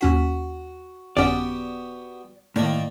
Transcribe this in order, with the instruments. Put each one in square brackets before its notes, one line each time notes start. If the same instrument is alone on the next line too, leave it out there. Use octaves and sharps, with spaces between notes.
[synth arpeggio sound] D#2 C#4 B6 [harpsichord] F#4
[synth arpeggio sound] G1 F2 C#4 [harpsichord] B3 F#4 G4 [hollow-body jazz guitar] D5
[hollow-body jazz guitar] A2 [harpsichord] D#3 A#3 D5